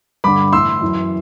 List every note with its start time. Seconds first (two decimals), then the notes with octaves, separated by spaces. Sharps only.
0.24 G2 D3 B5 D6
0.53 A2 E3 C6 E6
0.81 F#2 E3